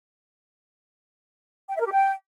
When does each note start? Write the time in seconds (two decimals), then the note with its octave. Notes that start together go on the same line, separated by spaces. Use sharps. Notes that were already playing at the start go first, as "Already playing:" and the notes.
1.69 G5
1.75 E5
1.81 A#4
1.86 G4
1.92 G5